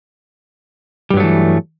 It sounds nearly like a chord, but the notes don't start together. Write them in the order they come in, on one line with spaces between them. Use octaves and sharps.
G3 G2 F#3 A3 E3